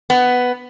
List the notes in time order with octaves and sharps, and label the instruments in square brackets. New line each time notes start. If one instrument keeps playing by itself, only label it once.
[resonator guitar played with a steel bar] B3